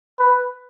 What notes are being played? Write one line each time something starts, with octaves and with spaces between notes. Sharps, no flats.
B4